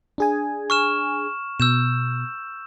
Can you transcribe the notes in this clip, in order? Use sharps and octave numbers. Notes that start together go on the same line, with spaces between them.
D4 G#4 G#5
C#6 F6 E7
B2 E6 G6 E7